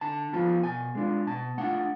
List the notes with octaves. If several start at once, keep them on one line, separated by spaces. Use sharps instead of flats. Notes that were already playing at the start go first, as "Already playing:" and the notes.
D3 A5
F3 B3 F4
B2 G#5
G#3 D4 F4
B2 A5
A3 D4 F4 F#5